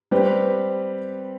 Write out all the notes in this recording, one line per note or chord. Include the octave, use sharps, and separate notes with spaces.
G3 C4 G4 B4